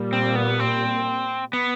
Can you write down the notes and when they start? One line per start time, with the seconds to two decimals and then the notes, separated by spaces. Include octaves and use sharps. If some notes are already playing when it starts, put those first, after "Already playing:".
Already playing: A#2 G3 A#3
0.13 C4
0.35 B3
0.60 C4
1.53 B3